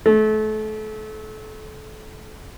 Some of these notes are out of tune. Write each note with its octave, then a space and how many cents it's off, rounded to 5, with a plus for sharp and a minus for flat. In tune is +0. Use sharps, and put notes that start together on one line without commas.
A3 -30